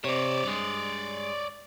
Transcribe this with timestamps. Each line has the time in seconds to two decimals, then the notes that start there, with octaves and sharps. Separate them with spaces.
0.04 C3 C#5 D5
0.44 G2 G#3